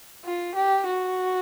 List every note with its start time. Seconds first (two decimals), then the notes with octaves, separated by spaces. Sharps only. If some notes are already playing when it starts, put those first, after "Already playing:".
0.25 F4
0.55 G4
0.86 F#4